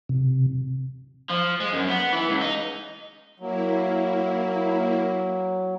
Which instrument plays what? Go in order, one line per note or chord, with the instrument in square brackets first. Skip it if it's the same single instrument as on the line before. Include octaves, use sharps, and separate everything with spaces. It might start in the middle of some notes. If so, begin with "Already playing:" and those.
[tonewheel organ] C3
[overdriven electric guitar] F3
G#3
F#2
B3
E3
C#2
D#4
[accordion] F#3 [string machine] A#3 E4